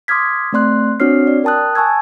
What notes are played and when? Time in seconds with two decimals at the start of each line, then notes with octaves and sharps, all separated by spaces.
0.08 C6 D6 D#6 F6 G#6 B6
0.53 A3 C4 D5 C6 F#6
1.00 C4 D4 F#4 C#5 F6 C7
1.27 D5
1.44 A#4 G5 A5 D#6 F#6
1.75 G#5 A5 C#6 E6 G#6